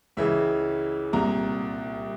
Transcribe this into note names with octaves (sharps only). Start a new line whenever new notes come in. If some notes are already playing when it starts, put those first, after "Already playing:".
C#2 C#3 E3 E5
C2 A#2 A#5